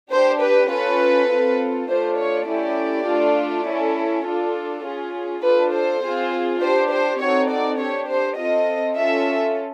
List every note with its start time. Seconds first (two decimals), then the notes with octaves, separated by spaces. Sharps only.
0.12 D4 G4 C5
0.42 B4
0.70 C#4 F4 A4 B4
1.30 C4 F4 A4
1.89 A3 D4 F4 C5
2.18 C#5
2.47 A3 C#4 E4 G4 D5
3.06 A3 D4 F4
3.66 C#4 E4 A4
4.25 D4 F4 A4
4.84 C#4 F4 G#4
5.43 D4 F4 A4 B4
5.72 C5
6.03 C4 F4 G#4
6.60 D4 G4 C5
6.91 C5
7.19 C4 D#4 F#4 A4 C#5
7.49 D5
7.79 D4 G4 C#5
8.08 C5
8.37 C4 F4 A4 D#5
8.97 C#4 F4 A4 E5